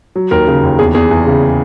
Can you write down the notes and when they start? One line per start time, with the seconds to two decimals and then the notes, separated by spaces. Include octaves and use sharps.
0.16 F#3
0.31 D#2 A#4
0.47 C#3
0.63 D#2
0.79 E2 G#4
0.95 E2 G#4
1.11 E2
1.27 C#3